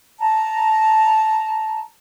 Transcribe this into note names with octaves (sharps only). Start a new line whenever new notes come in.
A5 A#5